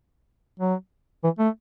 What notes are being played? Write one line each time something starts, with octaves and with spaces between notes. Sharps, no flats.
F#3
E3
A3